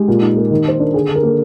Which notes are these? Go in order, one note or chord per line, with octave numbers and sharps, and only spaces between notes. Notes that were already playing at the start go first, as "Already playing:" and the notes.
Already playing: G#3 G4
A#2
D#4
A#3
D#3
D#3 C5
D4 A#4
D3 G#4
D3
A#4
A#3